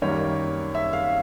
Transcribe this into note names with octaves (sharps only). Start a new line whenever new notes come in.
F#2 D#3 G3 A#3 C#5
E5
F5